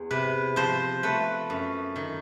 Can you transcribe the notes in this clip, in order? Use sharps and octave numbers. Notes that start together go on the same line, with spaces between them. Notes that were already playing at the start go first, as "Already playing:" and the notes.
Already playing: E2
C3 B4
F3 C5
A3 B4
F#2
D#3